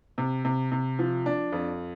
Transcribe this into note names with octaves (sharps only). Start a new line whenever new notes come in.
C3
C3
C3
F3
D4
F2